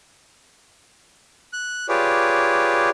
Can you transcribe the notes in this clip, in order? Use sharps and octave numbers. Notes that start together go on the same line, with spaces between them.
F#6
F4 G4 G#4 B4 C#5 D5